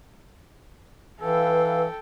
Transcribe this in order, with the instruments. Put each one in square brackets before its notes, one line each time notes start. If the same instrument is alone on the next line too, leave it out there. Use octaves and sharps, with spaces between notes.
[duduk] E3 [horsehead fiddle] A4 G5 [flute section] B4 F5 E6